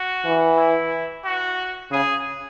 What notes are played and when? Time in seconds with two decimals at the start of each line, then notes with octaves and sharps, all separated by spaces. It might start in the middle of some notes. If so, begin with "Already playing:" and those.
Already playing: F#4
0.25 E3
0.57 E4
1.25 F#4
1.91 C#3 G#4